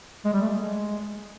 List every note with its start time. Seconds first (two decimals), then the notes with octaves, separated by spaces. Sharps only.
0.25 G#3
0.33 G3
0.42 A3
0.50 G#3